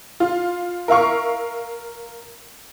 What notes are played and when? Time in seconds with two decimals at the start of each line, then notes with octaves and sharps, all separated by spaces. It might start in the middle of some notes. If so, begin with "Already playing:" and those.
0.20 F4
0.88 A#4 E5 F5 C#6